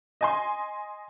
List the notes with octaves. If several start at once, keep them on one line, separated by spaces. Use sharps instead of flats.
D#5 G#5 C6